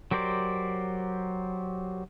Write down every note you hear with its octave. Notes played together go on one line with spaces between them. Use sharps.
F#3 G4 A#4 C5 D5